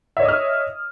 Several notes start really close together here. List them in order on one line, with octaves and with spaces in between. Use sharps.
E5 C#5 D#5 D#6 F6